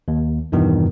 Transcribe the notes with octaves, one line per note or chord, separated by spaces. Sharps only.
D#2
E2 G2 B2 D#3 E3